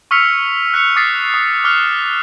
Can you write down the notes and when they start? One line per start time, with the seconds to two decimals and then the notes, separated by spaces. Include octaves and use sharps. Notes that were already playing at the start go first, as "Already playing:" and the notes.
0.11 C#6 E6 F6 B6 C#7 F7
0.74 F#6 B6 C#7 F7
0.96 D6 D#6 A6 B6 C7
1.34 D#6
1.64 D6 F6 F#6 F7